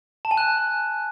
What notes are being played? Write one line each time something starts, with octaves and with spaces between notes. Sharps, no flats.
A5
G#5
F#6